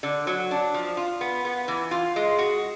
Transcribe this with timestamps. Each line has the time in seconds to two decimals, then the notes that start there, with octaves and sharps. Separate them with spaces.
0.03 D3
0.27 F#3
0.51 D4
0.74 F3
0.97 F4
1.21 B3
1.45 B3
1.68 E3
1.91 F4
2.16 G#3
2.38 F#4